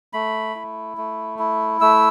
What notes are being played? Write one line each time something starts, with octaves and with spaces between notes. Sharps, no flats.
A3 B5
E4
A3
E4
A3 E6